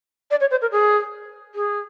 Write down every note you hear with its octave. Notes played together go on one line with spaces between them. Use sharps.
D5
C#5
C5
A#4
G#4
G#4